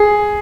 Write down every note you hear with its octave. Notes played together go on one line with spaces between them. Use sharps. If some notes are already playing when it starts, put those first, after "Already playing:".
Already playing: G#4